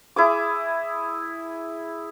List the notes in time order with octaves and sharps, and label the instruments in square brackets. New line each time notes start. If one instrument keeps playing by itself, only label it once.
[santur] E4 G#4 D6